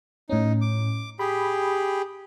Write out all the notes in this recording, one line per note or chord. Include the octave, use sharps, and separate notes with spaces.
A2 C#4 D#4
D6
G4 G#4 B5